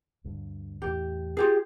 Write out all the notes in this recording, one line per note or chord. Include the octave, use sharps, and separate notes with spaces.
D2 G2 D3
E2 A2 G4
F4 G4 G#4